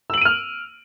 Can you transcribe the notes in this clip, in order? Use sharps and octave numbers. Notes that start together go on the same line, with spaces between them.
E6 F6 D7 D#7 F#7